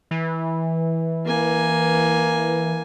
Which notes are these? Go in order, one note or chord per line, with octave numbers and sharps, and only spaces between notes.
E3
A#3 G#5